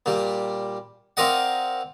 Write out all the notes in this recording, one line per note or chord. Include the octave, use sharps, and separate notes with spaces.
A#2 G3
C4 F4 A#4 D5 D#5 F#5